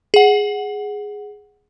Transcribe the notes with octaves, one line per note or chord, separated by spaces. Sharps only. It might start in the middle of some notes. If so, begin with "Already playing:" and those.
G#4 F#5